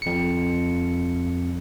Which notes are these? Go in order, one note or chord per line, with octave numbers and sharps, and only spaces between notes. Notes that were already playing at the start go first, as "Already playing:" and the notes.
F2 C#7